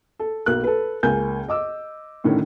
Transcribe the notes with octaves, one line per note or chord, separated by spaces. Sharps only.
A4
B1 A#3 F#6
A4 B4
C#2 A#3 G#5 G6
D#5 D6 E6
A2 D3 D#3 C#4